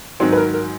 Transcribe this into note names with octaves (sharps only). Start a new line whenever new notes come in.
G#2 D#3 F#3 C4 C5
B4
A#4
A#4